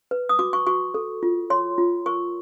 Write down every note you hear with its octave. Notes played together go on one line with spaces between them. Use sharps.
B4
D#6
F#4 D6
C#6
F#4 C#6
A4
F4
C#5 C6
F4
A#4 C#6